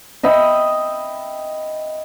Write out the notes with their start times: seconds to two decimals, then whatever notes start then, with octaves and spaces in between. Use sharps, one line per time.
0.23 D#5 E5 G5 B5